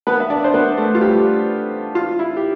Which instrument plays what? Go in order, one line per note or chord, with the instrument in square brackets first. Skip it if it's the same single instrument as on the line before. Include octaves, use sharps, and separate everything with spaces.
[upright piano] B3 B4
E5
D4 D5
C5
B3 B4
A3 A4
F4
G3 G4
F4
E4
G4